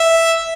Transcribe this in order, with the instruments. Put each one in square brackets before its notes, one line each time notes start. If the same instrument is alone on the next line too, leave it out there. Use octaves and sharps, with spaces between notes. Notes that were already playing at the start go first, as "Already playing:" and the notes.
Already playing: [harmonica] E5